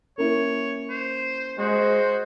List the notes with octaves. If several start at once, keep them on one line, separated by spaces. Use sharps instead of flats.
A#3 C#4 E4 C#5
C5
G#3 F#4 C5